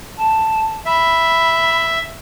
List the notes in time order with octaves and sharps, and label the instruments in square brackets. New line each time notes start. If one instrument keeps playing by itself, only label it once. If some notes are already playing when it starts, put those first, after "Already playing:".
[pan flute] A5
[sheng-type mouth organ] E5 [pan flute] B5